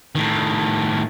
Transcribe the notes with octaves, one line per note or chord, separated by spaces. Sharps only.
A2 D#3